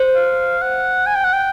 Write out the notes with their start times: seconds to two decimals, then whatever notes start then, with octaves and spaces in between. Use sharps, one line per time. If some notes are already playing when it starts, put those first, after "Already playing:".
Already playing: C5
0.15 F5
0.62 F#5
1.06 G#5
1.15 G5
1.24 F#5
1.33 G5